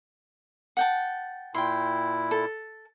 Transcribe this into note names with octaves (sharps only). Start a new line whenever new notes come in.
F#5 G5 A5
A#2 E4 G5 C6
A4